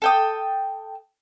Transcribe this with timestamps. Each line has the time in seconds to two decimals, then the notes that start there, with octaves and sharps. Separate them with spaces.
0.02 A4 G5 D#6